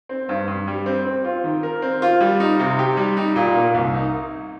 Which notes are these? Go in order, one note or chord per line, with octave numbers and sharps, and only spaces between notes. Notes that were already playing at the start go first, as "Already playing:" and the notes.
C4
G2
G2
G3
C4
C4
F4
D#3
A#4
C4
F4
G3
D#4
C3
G4
G3
D#4
A#2
A#3
C2
D#4